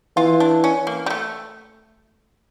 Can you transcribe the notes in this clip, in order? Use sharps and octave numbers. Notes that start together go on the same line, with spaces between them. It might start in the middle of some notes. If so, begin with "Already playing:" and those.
E3 F4
D4
C#4
A#3
G3
A3